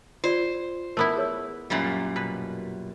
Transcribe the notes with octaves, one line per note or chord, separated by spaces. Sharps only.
F4 C5 D5
A3 B3 E4 A#4
G#4 C#5 E6
F#2 A#2 G3
B2 B4